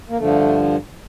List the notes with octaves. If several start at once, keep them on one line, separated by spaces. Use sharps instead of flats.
A#3
G2 D3 F3 A3